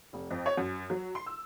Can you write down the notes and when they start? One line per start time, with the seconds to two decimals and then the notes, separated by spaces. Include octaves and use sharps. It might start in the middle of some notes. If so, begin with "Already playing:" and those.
0.13 F1
0.30 F2
0.46 C#5
0.57 F#2
0.90 F#3
1.15 C6
1.26 E6